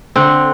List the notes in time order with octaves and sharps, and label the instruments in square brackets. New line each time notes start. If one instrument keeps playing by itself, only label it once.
[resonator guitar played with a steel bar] D3 [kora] C4